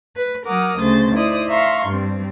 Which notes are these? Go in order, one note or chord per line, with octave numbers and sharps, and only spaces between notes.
B4
F#3 A#4 F#5 D6 D#6 F6
D2 C#3 A3 C5 A6
D#4 E4 C5 D5 D#6
E5 F5 A#5 C6 C#6 F6
G2 G3 C4